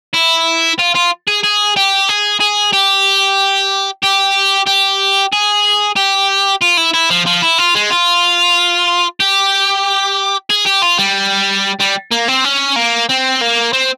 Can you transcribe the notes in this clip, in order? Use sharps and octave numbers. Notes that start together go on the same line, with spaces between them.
E4
F4
F4
G#4
G#4
G4
G#4
G#4
G4
G4
G4
G#4
G4
F4
E4
E4
F3
F3
E4
F4
G#3
F4
G4
G#4
G4
F4
G3
G3
A#3
C4
C#4
A#3
C4
A#3
C4